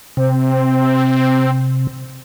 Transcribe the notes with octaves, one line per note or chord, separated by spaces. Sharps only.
C3 C4